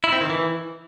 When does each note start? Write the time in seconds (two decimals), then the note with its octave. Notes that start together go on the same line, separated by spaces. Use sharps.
0.04 E4
0.12 C4
0.21 D#3
0.30 E3